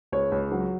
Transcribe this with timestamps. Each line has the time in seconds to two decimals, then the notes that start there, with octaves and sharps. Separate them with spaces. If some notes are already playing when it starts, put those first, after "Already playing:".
0.12 C#2 C#5
0.32 C#2
0.52 F#3